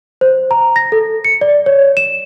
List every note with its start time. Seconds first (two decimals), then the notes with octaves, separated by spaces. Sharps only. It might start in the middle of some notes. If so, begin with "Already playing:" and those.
0.21 C5
0.51 A#5
0.76 A#6
0.92 A4
1.25 C#7
1.41 D5
1.66 C#5
1.97 E7